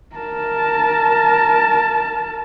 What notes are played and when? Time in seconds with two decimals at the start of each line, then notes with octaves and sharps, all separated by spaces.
0.16 A#4 A5